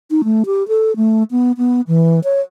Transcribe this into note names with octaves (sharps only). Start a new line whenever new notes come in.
D#4
A3
G4
A4
A3
B3
B3
E3
C#5